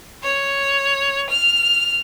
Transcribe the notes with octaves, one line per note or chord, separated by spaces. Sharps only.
C#5
F6